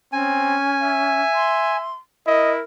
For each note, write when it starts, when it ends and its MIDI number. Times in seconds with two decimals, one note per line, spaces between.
0.12 0.56 60
0.12 1.21 61
0.12 1.77 80
0.82 1.94 76
1.34 1.94 84
2.27 2.62 64
2.27 2.62 70
2.27 2.52 75